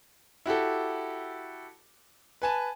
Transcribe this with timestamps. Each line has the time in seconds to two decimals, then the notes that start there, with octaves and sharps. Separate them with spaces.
0.46 E4 F#4 G4 A4
2.42 B4 G#5 A5